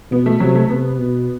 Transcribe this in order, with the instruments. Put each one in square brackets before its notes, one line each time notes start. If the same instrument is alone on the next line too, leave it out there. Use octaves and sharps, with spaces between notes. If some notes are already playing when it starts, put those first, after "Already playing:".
[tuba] B2 [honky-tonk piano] B3
[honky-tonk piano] A3
[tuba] C3 [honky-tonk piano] F#3
[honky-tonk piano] A3
[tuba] C3 [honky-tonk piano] B3
[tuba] B2